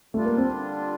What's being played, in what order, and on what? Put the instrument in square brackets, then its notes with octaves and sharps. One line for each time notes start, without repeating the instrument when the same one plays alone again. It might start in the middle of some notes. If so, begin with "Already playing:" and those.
[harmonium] D3 G3 D4 F4 [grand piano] A3
[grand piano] A#3
C4